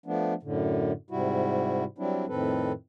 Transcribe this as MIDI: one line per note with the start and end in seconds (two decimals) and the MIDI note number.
0.06 0.34 53
0.06 0.34 57
0.06 0.34 59
0.06 0.34 62
0.43 0.92 42
0.43 0.92 45
0.43 0.92 50
1.11 1.85 44
1.11 1.85 48
1.11 1.85 55
1.11 1.85 64
1.11 1.85 66
1.98 2.26 54
1.98 2.26 55
1.98 2.26 60
1.98 2.26 62
1.98 2.26 64
2.28 2.72 41
2.28 2.72 45
2.28 2.72 51
2.28 2.72 60
2.28 2.72 69
2.28 2.72 71